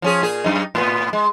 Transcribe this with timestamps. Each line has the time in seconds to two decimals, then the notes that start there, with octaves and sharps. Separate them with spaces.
0.02 F3 C#4 G#4
0.22 A#2 G#4
0.44 F#2 D#4
0.75 A2 B3
1.13 G#3